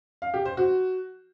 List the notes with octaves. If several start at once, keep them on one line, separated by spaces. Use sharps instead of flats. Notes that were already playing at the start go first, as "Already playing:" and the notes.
F5
G4
C5
F#4